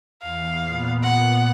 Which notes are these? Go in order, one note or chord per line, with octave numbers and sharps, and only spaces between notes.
E2 F5
A#2 B3
F#5